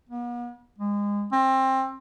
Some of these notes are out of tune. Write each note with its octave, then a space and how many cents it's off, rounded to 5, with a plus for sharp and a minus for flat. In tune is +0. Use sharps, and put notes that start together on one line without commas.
B3 -45
G#3 -25
C4 +20